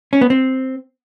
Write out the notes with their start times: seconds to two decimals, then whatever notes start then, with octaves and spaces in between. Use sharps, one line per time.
0.13 C#4
0.21 B3
0.30 C4